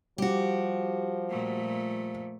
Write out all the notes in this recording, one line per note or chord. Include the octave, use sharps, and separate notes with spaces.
F3 G3 F#4 G4
A#2 A3